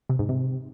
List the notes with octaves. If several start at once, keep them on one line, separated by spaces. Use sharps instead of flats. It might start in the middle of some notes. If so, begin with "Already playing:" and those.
C3
G#2
C3